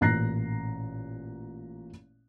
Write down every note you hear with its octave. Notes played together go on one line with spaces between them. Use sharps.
A1 A#2 A#5 F#6 A#6 C7